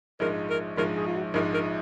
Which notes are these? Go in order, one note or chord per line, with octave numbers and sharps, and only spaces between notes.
A#1 G#2 F3 G#3 A#4
A#4
A#1 G#2 F3 G#3 A#4
G#4
F4
F#4
A#1 G#2 F3 G#3 A#4
A#4